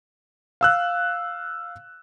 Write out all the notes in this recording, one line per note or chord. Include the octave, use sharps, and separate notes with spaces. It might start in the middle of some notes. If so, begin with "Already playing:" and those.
F5 E6 F#6